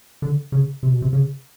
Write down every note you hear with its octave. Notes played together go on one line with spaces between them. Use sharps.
D3
C#3
C3
B2
C3
C#3